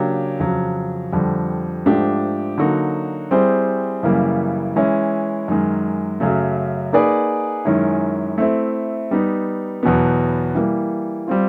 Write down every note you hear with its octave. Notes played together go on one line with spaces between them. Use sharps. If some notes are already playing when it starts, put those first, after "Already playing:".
Already playing: C#3 F#3 A#3 D4 G4
F2 C#3 F#3
F2 D3 G3
G#2 F3 A3 D4 G4
D3 F#3 A#3 D#4 F#4
G3 C4 E4 G#4 C5
F#2 C#3 E3 G3 A#3
E3 G#3 C#4 E4
F#2 D#3 G#3
F#2 C#3 F#3 A3
A#3 D#4 G#4 B4 D5
F#2 D#3 G#3 C#4 E4
A3 C4 E4
G3 B3 D#4
E2 B2 F#3 B3
E3 G3 A#3
G3 C4 F4